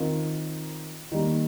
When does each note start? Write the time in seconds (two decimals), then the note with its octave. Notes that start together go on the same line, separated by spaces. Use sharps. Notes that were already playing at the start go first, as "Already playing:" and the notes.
Already playing: D#3 C4 F4 A#4
1.12 D#3 G3 A#3